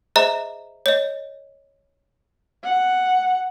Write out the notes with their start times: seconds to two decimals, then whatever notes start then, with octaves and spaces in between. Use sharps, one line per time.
0.16 G#4 C5 D#5 E5 A#5
0.86 C#5 D#5
2.63 F#5